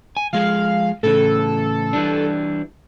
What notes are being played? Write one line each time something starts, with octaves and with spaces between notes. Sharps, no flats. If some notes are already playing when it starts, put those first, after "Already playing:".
G#5
F3 G#3 G#4 F5
A2 C#3 E3 A4
E3 G3 D4